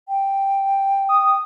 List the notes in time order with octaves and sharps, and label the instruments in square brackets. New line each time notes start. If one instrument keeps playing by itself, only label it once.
[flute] G5
[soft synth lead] D#6